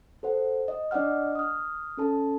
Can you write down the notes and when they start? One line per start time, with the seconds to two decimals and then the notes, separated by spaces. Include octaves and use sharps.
0.23 A4 C5 F#5
0.68 D#5
0.91 D4 D5 D#5 F#5 F6
1.35 D#6 F6
1.97 C#4 A4 A5